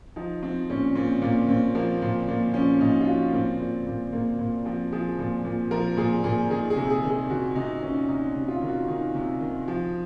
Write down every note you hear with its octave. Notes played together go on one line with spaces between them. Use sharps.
F3 D#4
F3 C4
A#2 C#4
A#2 C4
A#2 A#3
A#2 C4
F3 A#3
A#2
A#2
F3 C#4
A#2 D#4
F4
F3 F#4
A#2 C4
A#2
A#2
A#2 A#3
A#2
F3 C4
F3 G#4
A#2
A#2
F3 A#4
A#2 G#4
A#2 G#4
D#3 G#4
G#4
C3
G#4
D#3
G#4
D#3 F#4
C3 D#4
D#3 C#4
C3 D#4
C3
F4
D#3
F#4
D#3 D#4
C3
D#3
F3